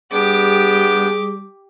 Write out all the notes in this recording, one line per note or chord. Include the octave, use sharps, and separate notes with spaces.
G3 B3 D4 G4 G#4 G5 D6